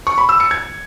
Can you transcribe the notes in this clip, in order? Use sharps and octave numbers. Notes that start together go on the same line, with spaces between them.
C#6
B5
E6
C#7
G#6